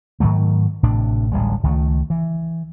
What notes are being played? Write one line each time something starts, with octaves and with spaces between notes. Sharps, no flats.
G#2 D#3 F#3 A3
A1 A2 C3 D4
D1 A1 G3 G#3
C#2 D#3 G#3 A3
E3